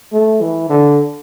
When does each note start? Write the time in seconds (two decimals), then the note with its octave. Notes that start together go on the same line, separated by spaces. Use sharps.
0.12 A3
0.41 E3
0.70 D3